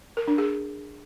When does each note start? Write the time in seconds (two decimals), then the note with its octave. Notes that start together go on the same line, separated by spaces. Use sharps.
0.17 A#4
0.28 D4
0.38 G#4